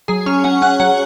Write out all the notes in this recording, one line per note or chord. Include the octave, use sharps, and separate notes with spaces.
F#3 G#4 G#5
C#4 C#5 C#6
C#4 F#5
C#4 F#5 F#6
F#3 F#5 F#6